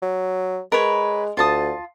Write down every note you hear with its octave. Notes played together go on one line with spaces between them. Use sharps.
F#3
G#3 A#4 B4 C#5
D2 F4 A5 D#6